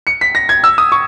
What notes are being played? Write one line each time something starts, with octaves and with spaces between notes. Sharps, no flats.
C#7
B6
A#6
G#6
E6
D#6
C#6